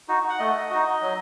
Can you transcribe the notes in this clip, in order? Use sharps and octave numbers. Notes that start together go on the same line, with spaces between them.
D#4 F#4
F#5
A3 D#5
D#4 F#4
F#3